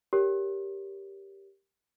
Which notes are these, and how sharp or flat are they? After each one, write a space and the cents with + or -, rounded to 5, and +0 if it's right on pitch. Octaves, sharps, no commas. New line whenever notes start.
G4 +0 A#4 +5 C#5 +15